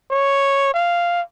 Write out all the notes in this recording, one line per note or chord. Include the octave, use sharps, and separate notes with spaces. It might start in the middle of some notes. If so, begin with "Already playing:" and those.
C#5
F5